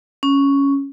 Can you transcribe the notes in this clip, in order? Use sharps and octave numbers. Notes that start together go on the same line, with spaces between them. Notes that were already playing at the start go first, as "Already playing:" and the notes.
C#4